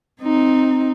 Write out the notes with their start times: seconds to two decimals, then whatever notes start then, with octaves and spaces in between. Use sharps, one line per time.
0.21 C4 D#4